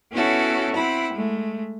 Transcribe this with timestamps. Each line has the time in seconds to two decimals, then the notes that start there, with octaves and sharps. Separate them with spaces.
0.13 B3 C#4 E4 F#4 A4 C#5
0.75 C4 E4 F#5 B5
1.13 G#3 A3